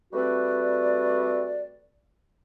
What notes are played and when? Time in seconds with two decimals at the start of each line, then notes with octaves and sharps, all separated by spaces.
0.13 G3 A3 C4 F#4 B4 D5